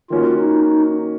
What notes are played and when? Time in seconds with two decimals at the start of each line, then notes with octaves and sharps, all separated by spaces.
0.10 D#3 A#3 C#4 F4 F#4
0.41 D#4